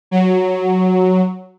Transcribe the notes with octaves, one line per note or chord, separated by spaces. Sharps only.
F#3